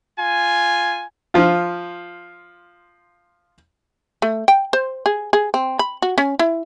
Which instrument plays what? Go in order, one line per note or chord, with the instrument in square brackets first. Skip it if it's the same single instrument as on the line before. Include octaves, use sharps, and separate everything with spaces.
[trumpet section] F4 G#5
[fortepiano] F3 F4
[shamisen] A3
G5
C5
G#4
G#4
C4
B5
F#4
C#4
E4